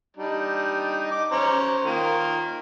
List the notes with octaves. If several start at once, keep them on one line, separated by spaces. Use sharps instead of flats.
G3 D4 D#4
D6
C#4 C5 A#5
D#3 A#3 F4